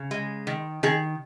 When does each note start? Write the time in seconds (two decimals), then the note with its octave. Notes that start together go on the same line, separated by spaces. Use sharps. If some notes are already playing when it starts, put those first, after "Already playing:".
Already playing: C#3
0.11 G#3
0.47 D#3
0.83 D#3 G#4